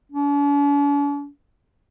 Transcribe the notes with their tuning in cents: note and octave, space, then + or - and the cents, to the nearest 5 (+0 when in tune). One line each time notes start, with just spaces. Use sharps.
D4 -45